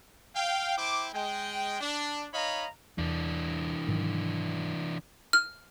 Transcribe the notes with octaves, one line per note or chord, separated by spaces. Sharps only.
F5 G5
E4 C5 G5 D6
G#3 G5
D4
D#4 C#5 D#5 F5 A#5 B5
E2 E3 D4
G#2 D#3 F#3
F6